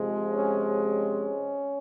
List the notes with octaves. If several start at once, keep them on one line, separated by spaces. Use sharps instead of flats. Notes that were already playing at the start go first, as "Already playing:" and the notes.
Already playing: C3 F3 G#3
C#4
C#4